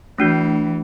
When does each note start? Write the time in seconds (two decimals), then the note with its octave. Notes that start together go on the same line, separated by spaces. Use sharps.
0.18 E3 A3 D4 F#4